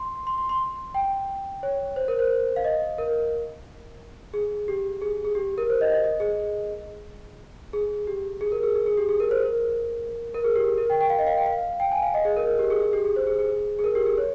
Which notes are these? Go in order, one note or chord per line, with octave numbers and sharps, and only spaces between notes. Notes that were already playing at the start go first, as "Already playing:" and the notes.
Already playing: C6
C6
C6
C6
G5
C#5
C5
A#4
C5
F5
D#5
A#4
G#4
G4
G#4
G#4
G4
A#4
C5
D#5
D#5
D#5
G#4
G#4
G4
G#4
A#4
G#4
G#4
G#4
G4
G#4
A#4
C5
A#4
A#4
G#4
G4
A#4
G5
G5
F5
D#5
F5
G5
F5
G5
G#5
F5
D#5
G#4
A#4
G4
G#4
G#4
G4
G#4
C5
G#4
G#4
G#4
A#4
G4
G#4
C#5